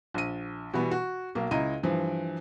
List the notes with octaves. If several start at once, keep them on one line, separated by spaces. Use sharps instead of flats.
A#1 D#7
B2 E3 G3 B3
F#4
B1 A#3
C#2 E4 D#5 A#5 D#7
G2 E3 F3